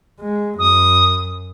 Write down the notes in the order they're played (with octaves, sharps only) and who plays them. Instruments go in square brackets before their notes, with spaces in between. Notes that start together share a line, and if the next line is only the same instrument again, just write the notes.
[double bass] G#3
[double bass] F#2 [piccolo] D#6